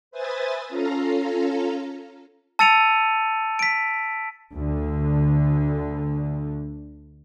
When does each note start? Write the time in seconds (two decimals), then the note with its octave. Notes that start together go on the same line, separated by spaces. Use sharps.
0.11 B4 C5 E5 G#5 D#6 A6
0.69 C#4 F4 A4 F5 A#5
2.59 A5 E6 A6 C#7 D#7 F7
3.59 B6 D7
4.53 D2 D3